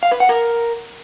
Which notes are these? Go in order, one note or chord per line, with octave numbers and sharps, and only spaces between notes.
F5
B4
F#5
A#4